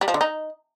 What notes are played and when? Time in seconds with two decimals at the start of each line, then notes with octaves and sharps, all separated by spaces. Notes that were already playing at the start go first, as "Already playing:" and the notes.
0.01 G3
0.08 F3
0.14 D3
0.21 D#4